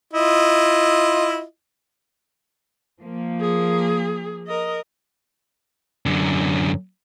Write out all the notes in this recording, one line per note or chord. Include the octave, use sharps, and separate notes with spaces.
E4 F4 D#5
F3 A#3
G#4
A#4 D#5
F#2 D3